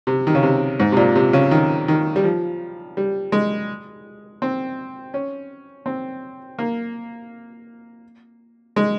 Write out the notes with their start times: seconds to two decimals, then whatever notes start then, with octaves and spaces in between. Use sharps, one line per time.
0.07 C3
0.27 D#3
0.35 C#3
0.43 C3
0.80 G#2
0.92 C3
0.97 A#2
1.16 C3
1.33 C#3
1.51 D#3
1.88 D#3
2.16 G3
2.24 F3
2.97 G3
3.32 G#3
4.42 C4
5.14 C#4
5.86 C4
6.59 A#3
8.76 G#3